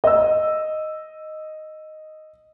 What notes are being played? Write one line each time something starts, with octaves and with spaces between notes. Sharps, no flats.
D#5 E6